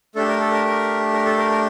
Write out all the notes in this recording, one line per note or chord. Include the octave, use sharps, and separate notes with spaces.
A3 D4 G4 A4
A#4
A4
A#4
A#4
A#4
A4
A#4
A#4